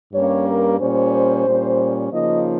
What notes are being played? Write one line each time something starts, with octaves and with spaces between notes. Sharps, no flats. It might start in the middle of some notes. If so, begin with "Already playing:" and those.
G2 G3 A#3 C#4 C#5
A#4
A#2 G3 C#4 C5
A#2 G3 C#4
C#3 F3 A#3 D#4 D#5